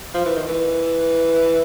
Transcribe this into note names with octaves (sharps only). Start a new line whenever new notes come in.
F3
E3
D#3
E3